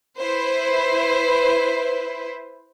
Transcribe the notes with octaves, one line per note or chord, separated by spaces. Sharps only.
E4 B4 C5